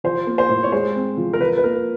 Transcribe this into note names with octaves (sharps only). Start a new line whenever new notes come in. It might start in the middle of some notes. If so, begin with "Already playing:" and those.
F3 C5
A#3
C5
A2
C#5
G#3 C5
C4
F3
A#4
F3 B4
B4
A#3 A#4